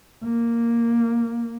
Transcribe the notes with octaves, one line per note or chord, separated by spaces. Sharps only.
A#3